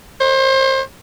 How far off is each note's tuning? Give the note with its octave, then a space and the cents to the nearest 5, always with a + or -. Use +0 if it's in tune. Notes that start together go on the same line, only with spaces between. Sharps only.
C5 +30